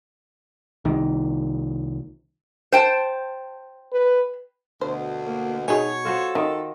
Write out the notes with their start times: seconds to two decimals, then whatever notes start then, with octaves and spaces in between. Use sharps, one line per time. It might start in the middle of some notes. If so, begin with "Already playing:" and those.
0.85 C2 D#3
2.72 C5 G5 A5
3.93 B4
4.81 D2 B2 C5
5.25 A#3
5.68 B2 D#4 G#4 C#5 G#5
6.05 F4 F#4 A4 C5
6.35 D#3 D#4